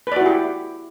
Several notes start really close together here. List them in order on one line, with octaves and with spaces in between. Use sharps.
B4 D5 F#4 E4 G4